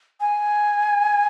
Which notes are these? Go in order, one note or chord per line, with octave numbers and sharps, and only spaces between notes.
G#5